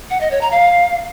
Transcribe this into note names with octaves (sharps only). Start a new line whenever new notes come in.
F#5
D#5
C#5
A#5
F5